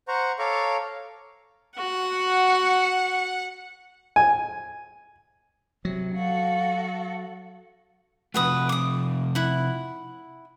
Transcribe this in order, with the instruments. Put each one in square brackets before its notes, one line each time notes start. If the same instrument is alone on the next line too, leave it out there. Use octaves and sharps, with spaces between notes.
[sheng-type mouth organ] C5 F#5 A#5 C#6
A4 C#5 F5 A#5 C#6 D6
[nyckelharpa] F#4 [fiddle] F#5
[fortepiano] G#5
[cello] C3 [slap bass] F#3
[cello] F#4 A4 [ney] F5
[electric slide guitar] C3 F3 A3 [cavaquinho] F#4 B4 D#6
[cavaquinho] D6 D#6
E4 F#5